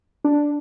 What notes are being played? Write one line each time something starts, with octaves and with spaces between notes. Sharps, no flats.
D4